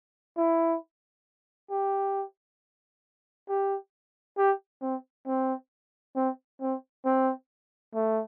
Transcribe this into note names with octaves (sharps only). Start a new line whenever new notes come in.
E4
G4
G4
G4
C4
C4
C4
C4
C4
A3